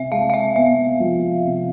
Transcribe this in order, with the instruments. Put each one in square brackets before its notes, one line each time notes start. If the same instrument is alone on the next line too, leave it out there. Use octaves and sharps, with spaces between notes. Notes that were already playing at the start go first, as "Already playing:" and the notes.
Already playing: [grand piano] C3 [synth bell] E5
[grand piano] G#3 [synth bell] F5
[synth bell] F5
E5
[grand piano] B3 [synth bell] E5
[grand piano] F3
C3